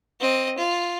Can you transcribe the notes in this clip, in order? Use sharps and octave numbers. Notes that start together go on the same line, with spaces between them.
C4 D#5
F4